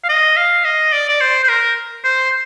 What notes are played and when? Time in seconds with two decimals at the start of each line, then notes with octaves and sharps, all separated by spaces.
0.04 F5
0.09 D#5
0.36 F5
0.65 D#5
0.93 D5
1.09 D5
1.20 C5
1.43 C5
1.49 A#4
2.04 C5